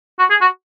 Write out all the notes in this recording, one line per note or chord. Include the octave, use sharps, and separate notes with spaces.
F#4
G#4
F#4